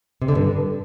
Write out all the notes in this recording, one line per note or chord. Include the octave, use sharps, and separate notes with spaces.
C3
D3
G2